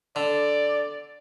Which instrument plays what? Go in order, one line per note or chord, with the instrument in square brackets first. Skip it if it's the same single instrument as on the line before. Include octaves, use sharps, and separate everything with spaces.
[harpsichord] D3 [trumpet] D5